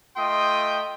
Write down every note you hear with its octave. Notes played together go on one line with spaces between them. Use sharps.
A3 F4 D#5 G5 C6 D#6